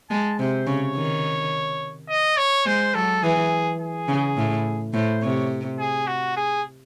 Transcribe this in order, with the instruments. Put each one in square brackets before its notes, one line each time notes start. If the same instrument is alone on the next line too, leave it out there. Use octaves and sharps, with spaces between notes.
[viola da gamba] G#3 [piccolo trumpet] A5
[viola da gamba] C3 [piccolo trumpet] C5
[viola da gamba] C#3 [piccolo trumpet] C#5
[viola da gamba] D#3
[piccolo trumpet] D#5
C#5
[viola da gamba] G#3 [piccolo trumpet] C5
[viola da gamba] F#3 [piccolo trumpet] A4
[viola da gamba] E3 [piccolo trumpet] G#4
[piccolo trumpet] G#4
[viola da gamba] C#3
A2
[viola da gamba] A2 [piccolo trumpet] C5
[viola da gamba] C3 [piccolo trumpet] C#5
[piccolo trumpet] G#4
F#4
G#4